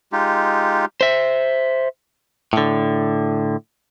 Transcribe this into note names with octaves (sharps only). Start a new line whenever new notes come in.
G#3 D#4 F4 G4
C5 E5
A2 D3